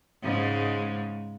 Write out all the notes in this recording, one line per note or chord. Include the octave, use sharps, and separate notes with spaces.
G#2 C#3 G#3